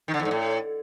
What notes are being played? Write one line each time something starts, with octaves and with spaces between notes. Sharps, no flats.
D#3
D3
E2
G#2
A2